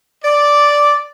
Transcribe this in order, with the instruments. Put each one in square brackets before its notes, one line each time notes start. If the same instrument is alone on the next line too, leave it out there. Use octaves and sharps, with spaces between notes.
[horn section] D5